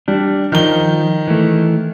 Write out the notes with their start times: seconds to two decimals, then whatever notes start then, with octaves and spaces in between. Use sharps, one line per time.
0.08 G3 D4
0.52 D#3 F3 G7
1.27 E3 A3